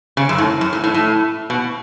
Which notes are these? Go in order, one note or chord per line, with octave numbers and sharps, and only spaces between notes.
C#3
F#2
A2
F#2
A2
A2
A2
B2